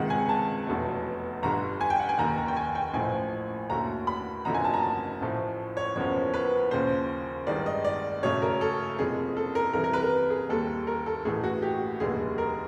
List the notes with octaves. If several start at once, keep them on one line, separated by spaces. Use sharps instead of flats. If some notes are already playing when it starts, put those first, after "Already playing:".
Already playing: C#2 C3 D#3 G#3 F#5
G#5
A5
F1 E2 B2 F#3 A3
G1 G2 D3 G3 A#5
G#5
G5
F#5
G#5
F1 D#2 D#3 A#5
A#5
G5
G#5
G5
A1 A2 F3 A3 G#5
D#2 D3 F#3 A3 A#5
B5
F#1 F2 D3 F#3 A3 A#5
G#5
A5
A#5
A5
A1 A2 F3 A3
C#5
F#1 E2 C#3 F3 C#5
B4
D#2 C#3 F3 C5
A1 G2 D#3 G#3 D5
D#5
D5
F#2 C#3 F#3 A3 C#5
A#4
A4
F#1 F2 C3 G#4
A4
A#4
C2 C3 E3 G3 A#4
A#4
B4
A#4
G#4
D#2 D#3 G3 A4
A#4
A4
A1 A2 E3 A3 G#4
F#4
G4
F1 D#2 D3 G3 G#4
A#4